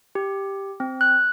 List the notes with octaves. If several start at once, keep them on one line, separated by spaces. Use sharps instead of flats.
G4
C4
F#6